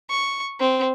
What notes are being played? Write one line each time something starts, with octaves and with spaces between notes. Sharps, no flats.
C#6
C4